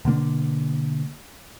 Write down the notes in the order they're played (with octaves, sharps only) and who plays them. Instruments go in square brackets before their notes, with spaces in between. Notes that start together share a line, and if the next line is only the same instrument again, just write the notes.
[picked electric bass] B2 D3 A#3 D4